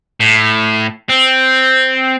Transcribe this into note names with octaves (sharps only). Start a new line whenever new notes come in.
A2
C4